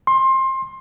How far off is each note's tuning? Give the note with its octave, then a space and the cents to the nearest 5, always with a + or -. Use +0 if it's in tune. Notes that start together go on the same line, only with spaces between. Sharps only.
C6 +25